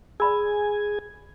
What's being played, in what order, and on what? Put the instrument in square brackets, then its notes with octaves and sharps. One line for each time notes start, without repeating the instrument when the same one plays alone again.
[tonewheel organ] G#4 G#5 [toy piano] D5 B5 E6